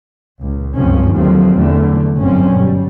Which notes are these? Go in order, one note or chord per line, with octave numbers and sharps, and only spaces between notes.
C#2 A#2
G1 C#2 F#2 F3 C4 C#4
D#2 D3 F3 F#3 A3 C4
E2 D3 A3
G1 F#2 A2 D3 C4 C#4
B2 G3